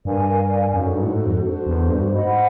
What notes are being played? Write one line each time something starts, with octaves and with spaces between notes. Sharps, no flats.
G2 A#4 D5 F5 G#5
F#2 D#4 F#4 A4
G2
A2
G#2
F2
D4 F#4 A4 C5
E2
G2
G#2 C5 D#5 F#5 B5